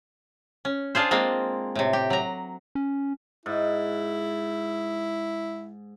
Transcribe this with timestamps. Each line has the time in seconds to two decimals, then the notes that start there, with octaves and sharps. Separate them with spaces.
0.65 C#4
0.95 D4 F4 G#4 C5
1.11 G#3 A#3 C4
1.75 A2 C3
1.93 G4
2.10 F#3 A#5
2.75 C#4
3.46 G#2 E4